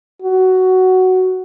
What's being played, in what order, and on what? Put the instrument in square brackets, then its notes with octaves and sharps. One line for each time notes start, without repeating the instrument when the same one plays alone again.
[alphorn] F#4